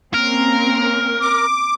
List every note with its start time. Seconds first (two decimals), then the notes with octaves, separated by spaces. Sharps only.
0.14 A#3 C4 C#4 A#4
1.21 D6